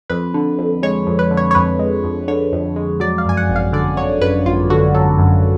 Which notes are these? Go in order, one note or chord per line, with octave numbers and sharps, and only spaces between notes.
F2 B4
D3
F2
G#3 C#5
F2
B4
D3
C#5
C#5
F2 B4
G#3
F2
D3 C#5
F2
G#3
F#3 D5
F5
F#2 G#5
F#5
G#1
F5
D3 D5
F#3 C#5
F#2 B4
G#1 F4
D3 F#4
F#3 A4
F#2